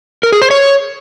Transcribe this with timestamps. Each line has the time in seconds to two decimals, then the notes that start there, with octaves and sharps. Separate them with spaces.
0.23 A#4
0.32 G#4
0.42 C5
0.51 C#5